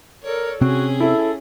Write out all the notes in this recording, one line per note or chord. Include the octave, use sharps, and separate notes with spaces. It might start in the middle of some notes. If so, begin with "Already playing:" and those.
A4 A#4 C#5 D5
C3 C4 C#4 F#4 G#4
E4 A4